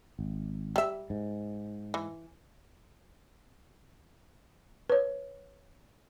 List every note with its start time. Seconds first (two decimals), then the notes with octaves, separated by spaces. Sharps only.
0.19 G#1
0.76 G3 E5
1.10 G#2
1.94 E3
4.90 B4 C#5